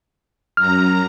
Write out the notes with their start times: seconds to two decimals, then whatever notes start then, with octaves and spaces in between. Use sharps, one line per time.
0.57 F#2 A#5 F6